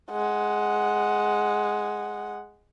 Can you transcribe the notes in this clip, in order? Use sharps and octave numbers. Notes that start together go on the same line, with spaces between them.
G#3 F#5